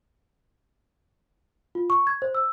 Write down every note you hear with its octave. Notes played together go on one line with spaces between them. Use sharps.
F4
C#6
G#6
C5
E6